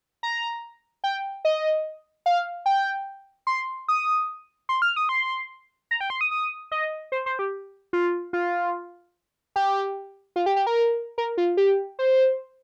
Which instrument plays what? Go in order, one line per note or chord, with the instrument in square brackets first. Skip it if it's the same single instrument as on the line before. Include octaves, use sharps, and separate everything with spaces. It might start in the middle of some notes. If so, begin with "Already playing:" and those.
[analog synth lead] A#5
G5
D#5
F5
G5
C6
D#6
C6
F6
D#6
C6
A#5
G5
C6
D#6
D#6
D#5
C5
C5
G4
F4
F4
G4
F4
G4
G4
A#4
A#4
F4
G4
C5